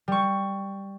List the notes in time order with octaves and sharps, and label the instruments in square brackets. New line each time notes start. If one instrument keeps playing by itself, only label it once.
[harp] G3 C#6